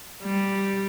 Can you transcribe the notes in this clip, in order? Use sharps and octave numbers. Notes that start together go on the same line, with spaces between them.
G3